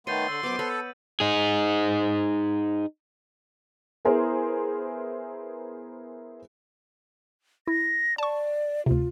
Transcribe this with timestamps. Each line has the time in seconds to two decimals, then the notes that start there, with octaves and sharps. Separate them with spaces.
0.07 D#3 A3 B3 C#5 C6 G6 A6 D#7
0.28 D3 E6 F#7
0.43 F#2 B3 C5 D6
0.59 A4 B4 C#5 B5
1.20 D#4 G#4
4.05 B3 E4 G#4 A#4 C5
7.67 E4 A#6
8.18 D5 A5 C#6
8.86 D2 C3 F4